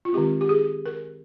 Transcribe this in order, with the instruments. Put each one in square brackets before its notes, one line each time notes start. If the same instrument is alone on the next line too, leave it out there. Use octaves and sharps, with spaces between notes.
[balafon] F4
D#3 G#3 C4 G4
G4
G#4
A#4